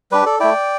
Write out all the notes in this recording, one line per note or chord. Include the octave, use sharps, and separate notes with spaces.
G3 D4 G4 B4
A4 D5
A3 E4 D5 G5